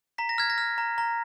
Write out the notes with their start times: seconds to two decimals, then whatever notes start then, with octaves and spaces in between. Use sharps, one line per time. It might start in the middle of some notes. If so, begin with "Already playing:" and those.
0.18 A#5 B6
0.29 A#6
0.38 F6 G#6
0.50 A#6
0.58 F6
0.78 A#5
0.98 A#5